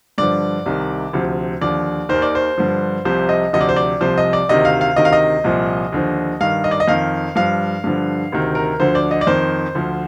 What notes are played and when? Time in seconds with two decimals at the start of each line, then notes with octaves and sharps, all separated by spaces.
0.18 G2 D3 F3 D5
0.66 C2 C3 D#3
1.13 D2 C3 F3
1.61 D#2 D3 F3 D5
2.09 D#2 D#3 C5
2.22 D5
2.35 C5
2.58 G2 D3 F3
3.05 C2 C3 F3 C5
3.29 D#5
3.53 D2 C3 F3 D#5
3.61 D5
3.69 C5
3.76 D5
4.01 C2 C3 F3 C5
4.18 D#5
4.33 D5
4.49 D2 C3 D#3 D#5
4.65 F5
4.81 F5
4.96 D2 C3 D#3 D#5
5.05 F5
5.13 D#5
5.44 C2 A#2 F3
5.92 D#2 D3 F3
6.40 G2 D#3 F5
6.64 D#5
6.71 D5
6.80 D#5
6.88 F2 D#3 F5
7.35 G2 F3 F5
7.84 G2 D3 F3
8.32 D2 C3 D#3
8.55 A#4
8.80 D2 D3 F3 C5
8.95 D5
9.11 D#5
9.21 D5
9.27 F2 D#3 C5
9.75 D2 D3 F3